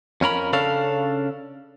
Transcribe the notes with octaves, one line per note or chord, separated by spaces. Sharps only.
F2 C#4 A#4 B5
C#3 C#4 D4 A4 F5